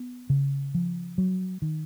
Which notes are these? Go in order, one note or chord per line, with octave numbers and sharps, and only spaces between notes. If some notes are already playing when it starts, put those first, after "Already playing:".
Already playing: B3
C#3
F3
F#3
D#3